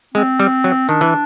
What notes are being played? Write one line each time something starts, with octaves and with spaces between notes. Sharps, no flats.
G#3 C4
G3
F#3
D#3 D4
E3